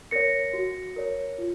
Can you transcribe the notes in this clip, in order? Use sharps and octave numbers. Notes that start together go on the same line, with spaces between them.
A#4 C#5 A#6 C#7
F#4
A#4 C#5
F4